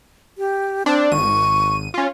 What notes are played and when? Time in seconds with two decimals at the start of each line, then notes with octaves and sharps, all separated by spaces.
0.38 G4
0.86 C4 D4
1.12 G#1 C#6 D#7
1.94 C#4 F4